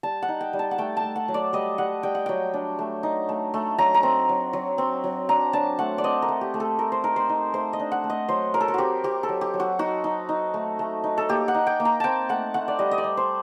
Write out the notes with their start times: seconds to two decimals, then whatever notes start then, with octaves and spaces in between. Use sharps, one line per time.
0.03 G3 A5
0.22 F#5
0.28 D#4
0.41 G5
0.53 G3
0.59 A5
0.71 F#5
0.78 A3 G5
0.97 A5
1.04 A3
1.16 F#5
1.28 F#3
1.34 D5
1.53 G3 D#5
1.78 G3 F#5
2.03 G3 G5
2.15 F#5
2.26 F#3 G5
2.54 D4
2.79 A3
3.03 D#4
3.29 A3
3.54 A3
3.78 F#3 A#5
3.94 A#5
4.03 C4
4.29 F#3
4.53 F#3
4.78 C4
5.04 F#3
5.29 D4 A#5
5.53 D4 A5
5.79 A3 F#5
5.98 D5
6.04 C4 D#5
6.22 A#4
6.28 A3
6.41 G4
6.54 A3
6.60 A4
6.79 A3 A#4
6.92 C5
7.03 D#4 A#4
7.16 C5
7.29 D#4
7.53 A3 C5
7.73 D#5
7.79 D4
7.92 F#5
8.04 A3
8.10 D#5
8.28 F#3 C5
8.54 F#3 A#4
8.60 A4
8.68 A#4
8.74 C4 F#4 G4
9.04 C4 G4
9.23 A4
9.29 F#3
9.41 G4
9.54 F#3
9.60 F#4
9.79 D#4 F#4
10.04 D#4
10.29 D#4
10.54 A3
10.79 A3
11.04 D#4
11.18 A4
11.29 A#3 G4
11.48 F#5
11.54 D#4
11.67 G5
11.80 A#3
11.85 A#5
12.00 C4 G5 A5
12.29 A3 F#5
12.54 A3 F#5
12.68 D5
12.79 G3 D#5
12.91 D#5
12.98 D5
13.04 G3
13.17 C5